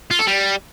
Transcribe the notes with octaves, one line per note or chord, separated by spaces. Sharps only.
F4
A4
G3